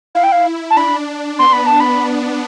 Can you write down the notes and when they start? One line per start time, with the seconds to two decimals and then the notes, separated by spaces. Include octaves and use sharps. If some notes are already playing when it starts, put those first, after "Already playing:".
0.15 E4 F5
0.23 G5
0.32 F5
0.70 A5
0.77 D4 B5
1.39 B3 C6
1.52 B5
1.66 A5
1.80 B5